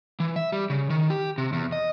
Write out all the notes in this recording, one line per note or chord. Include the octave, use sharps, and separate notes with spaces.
E3
E5
G3
C#3
D#3
G4
C3
E2
D#5